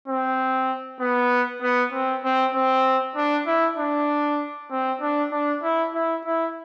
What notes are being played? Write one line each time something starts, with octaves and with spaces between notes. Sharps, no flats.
C4
B3
B3
C4
C4
C4
D4
E4
D4
C4
D4
D4
E4
E4
E4